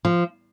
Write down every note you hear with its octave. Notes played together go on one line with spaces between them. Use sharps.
F3